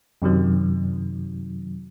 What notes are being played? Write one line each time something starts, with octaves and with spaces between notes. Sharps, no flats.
F#2 C3 D#3 F#3